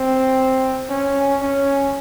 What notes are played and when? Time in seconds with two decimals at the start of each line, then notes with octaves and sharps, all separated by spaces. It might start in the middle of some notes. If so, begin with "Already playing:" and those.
Already playing: C4
0.90 C#4
1.42 C#4